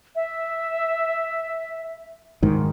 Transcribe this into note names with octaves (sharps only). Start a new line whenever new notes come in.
E5
G#2 D#3